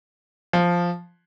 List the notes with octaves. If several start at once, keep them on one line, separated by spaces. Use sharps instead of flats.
F3